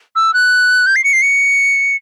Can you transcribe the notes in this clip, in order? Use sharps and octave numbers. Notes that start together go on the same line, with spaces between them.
E6
F#6
G6
C7
C#7
C7
C#7